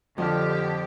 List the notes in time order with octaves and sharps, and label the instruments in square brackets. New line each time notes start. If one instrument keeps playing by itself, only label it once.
[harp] F2 F6 [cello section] D3 G4